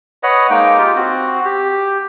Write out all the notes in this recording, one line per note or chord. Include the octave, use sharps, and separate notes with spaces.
B4 C#5 D#5 F#5
G#3 A#3 D#4 G5
F4 G4
C4 F#4
G4